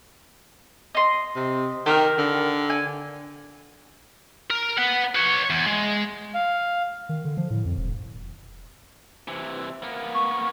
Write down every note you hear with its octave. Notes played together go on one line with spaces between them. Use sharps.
D#5 C6
C3
D#3 G4 A#4
D3
G#5
A#4
B4 F#5
B4 C#5
E2
G#3
F5
D#3
D3
F3
A2
F2
E1
C3 E3
A#3 B3
C#6